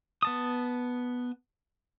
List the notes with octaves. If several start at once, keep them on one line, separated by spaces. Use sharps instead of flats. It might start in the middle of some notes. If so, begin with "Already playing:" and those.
B3 A5 D#6